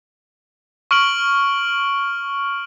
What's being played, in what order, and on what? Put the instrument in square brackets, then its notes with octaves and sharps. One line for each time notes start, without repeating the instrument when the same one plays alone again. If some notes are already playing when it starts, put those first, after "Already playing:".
[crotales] C#6 F6 D7 F#7